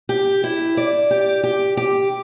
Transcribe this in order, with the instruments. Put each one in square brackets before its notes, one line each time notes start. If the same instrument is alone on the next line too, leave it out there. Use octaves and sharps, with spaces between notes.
[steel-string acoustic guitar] G4
E4
D5
G4
G4
G4